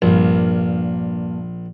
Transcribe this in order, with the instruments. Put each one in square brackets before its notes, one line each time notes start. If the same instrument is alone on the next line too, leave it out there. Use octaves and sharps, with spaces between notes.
[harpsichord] A#1 [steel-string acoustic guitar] G2 A#3